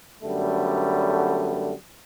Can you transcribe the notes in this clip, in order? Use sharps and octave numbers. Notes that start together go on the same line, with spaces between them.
F#2 D3 G3 A3 B3